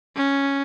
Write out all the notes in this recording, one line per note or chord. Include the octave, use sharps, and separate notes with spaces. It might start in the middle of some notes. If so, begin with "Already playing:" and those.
C#4